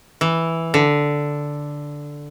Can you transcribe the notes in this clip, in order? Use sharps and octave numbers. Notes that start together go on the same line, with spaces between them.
E3
D3